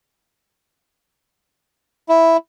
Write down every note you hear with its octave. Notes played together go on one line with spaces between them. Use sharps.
E4